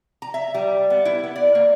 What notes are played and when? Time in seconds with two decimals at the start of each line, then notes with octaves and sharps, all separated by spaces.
0.22 A#5
0.34 E5
0.54 G3
0.90 B3
1.05 E4
1.24 B3
1.36 D5
1.55 A#3